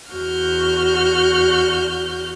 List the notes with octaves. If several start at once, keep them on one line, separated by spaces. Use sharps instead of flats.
E2 F#4 F6 G6